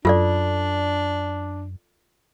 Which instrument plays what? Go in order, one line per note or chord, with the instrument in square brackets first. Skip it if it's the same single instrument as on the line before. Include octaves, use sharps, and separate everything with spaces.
[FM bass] F#2 [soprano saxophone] D4 [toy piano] F4 A4 D5